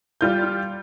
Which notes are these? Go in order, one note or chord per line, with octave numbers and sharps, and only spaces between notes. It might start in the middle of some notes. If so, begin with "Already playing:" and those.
G3 F4 G6